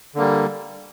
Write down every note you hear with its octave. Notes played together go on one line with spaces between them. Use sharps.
D3 G3 A#3